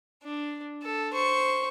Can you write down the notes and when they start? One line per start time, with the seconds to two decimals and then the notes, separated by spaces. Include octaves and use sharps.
0.23 D4
0.83 A4
1.14 C5 C#6